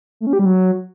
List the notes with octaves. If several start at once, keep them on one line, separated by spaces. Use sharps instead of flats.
A3
C#4
G4
G3
F#3